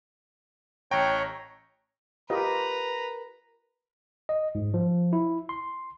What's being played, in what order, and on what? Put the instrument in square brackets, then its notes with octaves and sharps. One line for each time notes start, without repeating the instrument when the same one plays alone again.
[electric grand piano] A1 G5 [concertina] C#5 A#5
[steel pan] F4 G4 D#5 [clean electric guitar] A#4 [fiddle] B4 [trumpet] A#5
[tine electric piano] D#5
G#2
F3
E4
C6